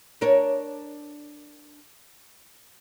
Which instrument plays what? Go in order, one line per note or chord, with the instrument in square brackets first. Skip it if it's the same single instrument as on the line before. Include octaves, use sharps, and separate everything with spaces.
[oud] D4 A#4 C#5